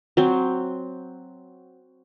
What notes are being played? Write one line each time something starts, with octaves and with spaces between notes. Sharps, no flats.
F#3 C4